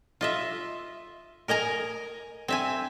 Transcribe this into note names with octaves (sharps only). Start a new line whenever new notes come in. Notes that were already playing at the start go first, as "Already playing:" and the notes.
F4 D#5 E5
A#4 D#5 G#5 A#5
C4 E5 G#5